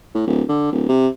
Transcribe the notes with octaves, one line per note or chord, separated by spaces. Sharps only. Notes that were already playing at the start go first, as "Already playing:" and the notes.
A2
D1
D3
D1
C3